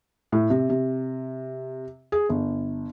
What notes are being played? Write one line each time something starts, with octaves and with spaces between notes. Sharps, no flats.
A2
C3
C3
G#4
G1